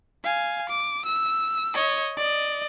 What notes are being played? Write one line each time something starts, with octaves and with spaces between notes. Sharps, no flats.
F5 G#5
D6
E6
C#5 D#5
D5 D#5